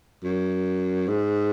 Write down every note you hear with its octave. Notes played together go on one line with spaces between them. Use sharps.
F#2
G#2